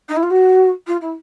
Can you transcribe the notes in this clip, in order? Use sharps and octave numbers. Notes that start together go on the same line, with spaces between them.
D#4
E4
F4
F#4
F4
E4